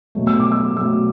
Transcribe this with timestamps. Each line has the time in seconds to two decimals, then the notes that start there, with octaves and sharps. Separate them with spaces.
0.15 B2 F#3 A3
0.27 E6
0.40 D6
0.52 E6
0.76 B2 F#3 A3 E6